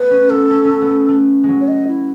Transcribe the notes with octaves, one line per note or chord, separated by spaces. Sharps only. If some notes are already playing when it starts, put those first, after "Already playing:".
Already playing: A3 B3 B4
C#4
B3 A4
C#4
B3 C#4
B3
A3
A3
F#3 G#3
C#5
D#5
E4